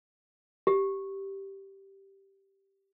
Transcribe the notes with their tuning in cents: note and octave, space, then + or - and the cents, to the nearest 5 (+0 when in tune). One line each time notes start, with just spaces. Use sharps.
G4 -5